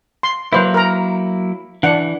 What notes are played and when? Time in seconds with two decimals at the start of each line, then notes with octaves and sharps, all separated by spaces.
0.23 C6
0.53 F#3 A#3 E4 B4 C5
0.74 A#4 A#5
1.83 E3 D4 F#5